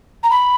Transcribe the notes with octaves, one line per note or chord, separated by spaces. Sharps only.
A#5
B5